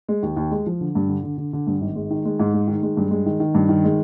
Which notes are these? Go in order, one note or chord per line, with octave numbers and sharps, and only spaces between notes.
G#3
D#2
D#2
G#3
F3
D3
G2
D3
D3
D3
D3
G2
G#1
G#3
D#3
G#3
G#2
G#3
D#3
G#3
G2
G#3
D#3
D#3
G2
D#3
G#3